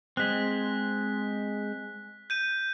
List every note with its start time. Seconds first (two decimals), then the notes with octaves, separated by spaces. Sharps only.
0.17 G#3 C4 F#6 B6
2.30 G6 D#7